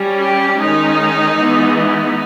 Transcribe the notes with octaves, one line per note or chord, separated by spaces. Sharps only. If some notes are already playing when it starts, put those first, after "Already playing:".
Already playing: G3 C#4
G4
D#3 G#3 C#4 D#4
E3 G#3 B3
D#4